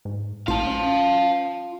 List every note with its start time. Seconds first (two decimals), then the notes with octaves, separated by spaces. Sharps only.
0.05 G#2
0.48 A#1 F4 F5 A5
0.67 C#4